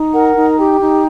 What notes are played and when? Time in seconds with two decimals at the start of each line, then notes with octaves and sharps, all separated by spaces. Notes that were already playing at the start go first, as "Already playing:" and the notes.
Already playing: D#4
0.14 A#4 F#5
0.37 D#4
0.58 G4 G5
0.81 D#4